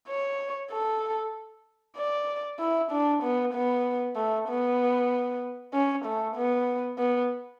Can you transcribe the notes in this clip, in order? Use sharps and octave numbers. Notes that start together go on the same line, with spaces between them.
C#5
A4
D5
E4
D4
B3
B3
A3
B3
C#4
A3
B3
B3